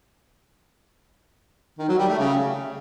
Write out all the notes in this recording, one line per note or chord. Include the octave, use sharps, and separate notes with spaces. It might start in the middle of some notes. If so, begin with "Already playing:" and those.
D#3
F#3
G3
A3
C#3